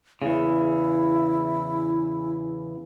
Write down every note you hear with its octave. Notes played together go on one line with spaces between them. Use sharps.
E2 C#3 E4